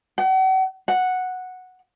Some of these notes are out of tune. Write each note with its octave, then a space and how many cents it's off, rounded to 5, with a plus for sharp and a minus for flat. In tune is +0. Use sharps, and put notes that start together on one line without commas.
F#5 +40
F#5 -5